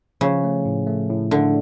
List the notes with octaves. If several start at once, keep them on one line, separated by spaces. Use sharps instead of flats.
C#3 F3
A3
A2
A3
A2
D3 A3